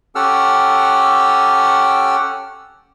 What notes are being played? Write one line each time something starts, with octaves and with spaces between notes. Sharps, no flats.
C#4 G4 A4 F#5 E6 F6